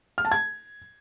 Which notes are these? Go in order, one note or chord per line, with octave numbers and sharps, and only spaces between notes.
F6
A5
G#6